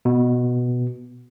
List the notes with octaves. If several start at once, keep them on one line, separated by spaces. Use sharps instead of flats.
B2